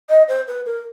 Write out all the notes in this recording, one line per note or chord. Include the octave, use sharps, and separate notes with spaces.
D#5
C5
B4
A#4